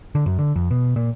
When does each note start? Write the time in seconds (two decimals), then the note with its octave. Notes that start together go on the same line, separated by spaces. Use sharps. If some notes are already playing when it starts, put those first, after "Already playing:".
0.15 D3
0.26 F#2
0.39 D3
0.56 F2
0.71 B2
0.96 A#2